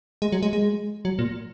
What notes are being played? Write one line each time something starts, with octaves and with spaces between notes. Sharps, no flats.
G#3
F#3
G#3
G#3
F#3
A#2